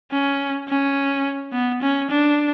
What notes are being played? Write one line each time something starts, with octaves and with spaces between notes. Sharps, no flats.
C#4
C#4
B3
C#4
D4